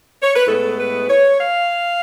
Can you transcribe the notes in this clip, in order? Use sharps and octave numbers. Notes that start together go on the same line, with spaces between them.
C#5
B4
A2 G#3 B3 A4
B4
C#5
F5